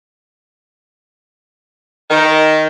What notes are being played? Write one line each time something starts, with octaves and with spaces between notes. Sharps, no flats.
D#3